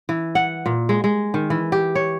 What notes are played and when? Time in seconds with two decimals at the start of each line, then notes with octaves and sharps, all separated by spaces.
0.09 E3
0.35 F#5
0.66 A#2
0.89 G#3
1.04 G#3
1.34 D#3
1.50 E3
1.72 G4
1.95 C#5